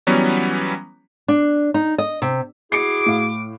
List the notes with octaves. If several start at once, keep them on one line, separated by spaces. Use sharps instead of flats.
E3 F#3 G3 B3 C#4
D4
D#4
D#5
C3
E4 F#4 G#4 D6 C7 C#7
A2 F5